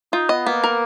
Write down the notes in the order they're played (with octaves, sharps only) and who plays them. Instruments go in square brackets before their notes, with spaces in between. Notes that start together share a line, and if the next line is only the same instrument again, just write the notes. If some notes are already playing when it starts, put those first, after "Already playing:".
[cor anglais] D#4 [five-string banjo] F4
[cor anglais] B3 [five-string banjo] D#5
[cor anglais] A#3 [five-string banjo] B3
[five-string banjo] A#4